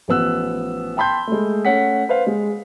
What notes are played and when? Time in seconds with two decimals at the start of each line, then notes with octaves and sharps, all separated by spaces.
0.08 A1 F3 B3 E6 F#6
0.97 G5 A5 B5 C6 G6
1.27 G#3 A3
1.65 A3 C#4 F#5 B6
2.09 B4 C5 F5
2.27 G#3